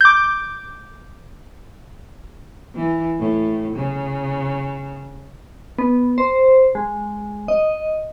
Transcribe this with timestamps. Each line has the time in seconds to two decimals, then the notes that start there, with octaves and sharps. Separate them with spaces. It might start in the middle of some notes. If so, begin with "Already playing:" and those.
0.01 D6 G6
2.75 E3
3.19 A2
3.76 C#3
5.79 B3
6.18 C5
6.75 G#3
7.48 D#5